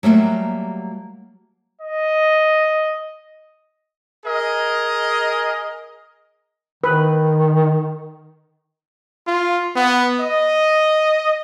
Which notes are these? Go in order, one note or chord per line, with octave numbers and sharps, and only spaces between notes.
F#3 G3 A3 A#3 F#4
D#5
G#4 A#4 D#5
D#3 B4
F4
B3
D#5